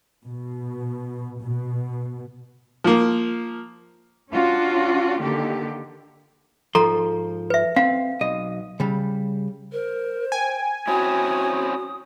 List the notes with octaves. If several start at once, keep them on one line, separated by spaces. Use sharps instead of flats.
B2
B2
F3 A#3
C#4 D4 F4 F#4
D3 D#3 A#3 G4
G#2 F3 A4 A#5 C6
B4 E5
C4 F5
B1 D#5
C#3 G3
A#4 C5
G5 G#5
C4 C#4 E4 F#4 D#6